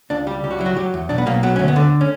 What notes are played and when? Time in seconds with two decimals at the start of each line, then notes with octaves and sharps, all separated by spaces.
0.10 C#2 D4
0.27 G3 G4
0.44 C#2 G4
0.51 F#4
0.59 F#3 E4
0.66 F#4
0.77 F#3 G4
0.94 E2
1.09 B1 D4
1.18 B3
1.26 B1 A#3
1.43 F#3 B3
1.56 D2 C#4
1.68 B3
1.76 D3
2.01 C#4